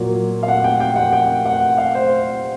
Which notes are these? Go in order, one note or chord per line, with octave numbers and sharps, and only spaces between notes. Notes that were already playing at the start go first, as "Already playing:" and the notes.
Already playing: A#2 F#3 A#3
F5
F#5
G5
G5
F#5
G5
F#5
F5
C5